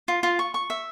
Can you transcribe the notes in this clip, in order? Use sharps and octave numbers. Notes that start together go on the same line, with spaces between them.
F4
F4
C#6
C#6
E5